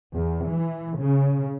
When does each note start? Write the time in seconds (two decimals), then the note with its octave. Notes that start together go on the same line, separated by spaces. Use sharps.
0.15 E2
0.49 E3
0.98 C#3